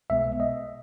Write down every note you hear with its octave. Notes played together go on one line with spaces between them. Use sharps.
C2 B2 G#3 B3 E5
D#5